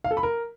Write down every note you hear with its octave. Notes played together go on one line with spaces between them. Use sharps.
F5
A4
B5
A#4